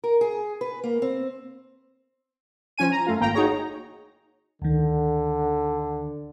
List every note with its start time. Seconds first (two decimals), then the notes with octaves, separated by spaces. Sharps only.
0.04 A#4
0.21 G#4
0.61 B4
0.84 A#3
1.02 C4
2.78 F3 C#4 G#5 D#7
2.91 A#5
3.07 F#2 A3 F4
3.20 G#1 A#3 G5 A#5
3.34 D#4 F#4 G#4 C#5 A#5
4.62 D2 D3 D#3